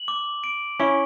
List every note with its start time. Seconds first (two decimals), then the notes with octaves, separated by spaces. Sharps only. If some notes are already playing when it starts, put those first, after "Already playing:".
Already playing: F#7
0.08 D6
0.44 D7
0.80 C#4 E4 C#6